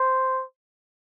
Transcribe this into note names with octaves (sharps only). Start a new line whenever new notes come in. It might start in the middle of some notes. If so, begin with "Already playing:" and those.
Already playing: C5